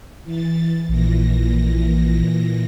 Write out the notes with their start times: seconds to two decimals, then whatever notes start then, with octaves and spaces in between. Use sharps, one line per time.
0.24 E3 A6
0.89 A#1 A#2 E3 A#6